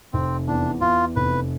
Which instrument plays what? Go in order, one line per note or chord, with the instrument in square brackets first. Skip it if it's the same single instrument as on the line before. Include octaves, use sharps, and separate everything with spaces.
[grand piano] F1 [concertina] C4
[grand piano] E2 [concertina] D4
[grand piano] E2 [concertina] F4
[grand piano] F1 [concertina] B4